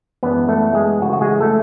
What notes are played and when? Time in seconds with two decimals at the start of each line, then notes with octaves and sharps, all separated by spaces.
0.23 F#2 E3 G#3 B3 D4 B4
0.49 A3 A4
0.75 G#3 G#4
1.02 C#3 E3 A3 F#4
1.13 F#4
1.21 G#3 G#4
1.40 A3 A4